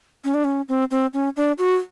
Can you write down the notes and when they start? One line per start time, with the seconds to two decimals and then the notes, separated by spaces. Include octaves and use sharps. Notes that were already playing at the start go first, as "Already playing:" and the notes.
0.24 C#4
0.34 D4
0.44 C#4
0.69 C4
0.91 C4
1.13 C#4
1.37 D4
1.58 F#4